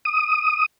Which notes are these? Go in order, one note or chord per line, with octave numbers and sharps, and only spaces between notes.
D#6